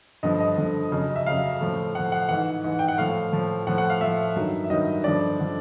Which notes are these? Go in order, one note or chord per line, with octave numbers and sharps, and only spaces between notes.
G2 D3 F3 D#5
D#5
G2 D3 F3
F2 C#3 F#3
E5
F2 C#3 F#3 F5
A2 F3
A2 F3 F#5
F#5
G#2 E3 F#5
G#2 E3
G5
F#5
A2 F3 F5
A2 F3
A2 F3 F#5
F#5
F5
A2 F3 E5
G2 D#3 F#3
E5
G2 D#3 F#3 D#5
G2 D3 F3 D5
D3 F3